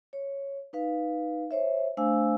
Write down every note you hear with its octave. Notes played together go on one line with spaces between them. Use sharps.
C#5
D#4 B4 F5
C5 C#5 E5
A3 D4 C5 F5 G#5 E6